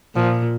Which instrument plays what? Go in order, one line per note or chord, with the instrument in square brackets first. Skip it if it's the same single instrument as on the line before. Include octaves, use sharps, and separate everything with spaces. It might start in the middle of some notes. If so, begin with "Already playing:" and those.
[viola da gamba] A#2 [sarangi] F3